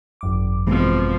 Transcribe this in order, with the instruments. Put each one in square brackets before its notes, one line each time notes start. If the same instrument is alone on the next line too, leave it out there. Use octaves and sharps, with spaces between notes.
[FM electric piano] G#1 F#2 D6
[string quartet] B2 F3 [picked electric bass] E3 G#3 C4